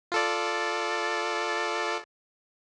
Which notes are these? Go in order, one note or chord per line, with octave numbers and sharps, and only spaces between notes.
F4 A4 D5